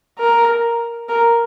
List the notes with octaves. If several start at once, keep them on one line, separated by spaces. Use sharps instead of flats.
A#4
A#4